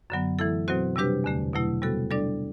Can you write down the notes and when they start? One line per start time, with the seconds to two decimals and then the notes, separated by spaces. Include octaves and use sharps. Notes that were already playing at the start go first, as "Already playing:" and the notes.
0.10 F#2 D3 F#3 B3
0.39 E3 A3 E4 A4
0.68 B2 F#3 C4 F#4 C5
0.96 C3 G3 D4 G4 B4
1.24 E2 D3 A3
1.53 B2 F#3 A3 E4
1.82 C3 G3 B3 F#4 A4
2.10 G3 D4 A4 D5